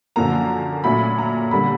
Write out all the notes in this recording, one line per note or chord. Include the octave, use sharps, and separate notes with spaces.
F#2 D3 F3 A#3 A#5
A#2 F#3 A3 C#4 B5
A#5
D3 G3 A#3 B5